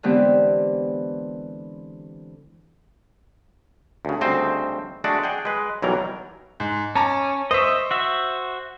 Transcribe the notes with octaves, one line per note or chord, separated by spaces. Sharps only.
D3 E3 G#3 B3 C4 G4
D2 C#3
D2 C#3 G3 C4 C5 D#5
G#3 A3 D4 F#4 D5
G#4 F#5 G5
G#3 B4
B1 E3 F#3 G3 A#4 A#5
G#2
C#4 A5 A#5 D6
C5 D#5 E5 C#6
F#4 E5